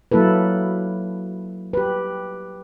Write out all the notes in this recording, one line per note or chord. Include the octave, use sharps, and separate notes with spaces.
F#3 A#3 E4 A4 B4
G4 B4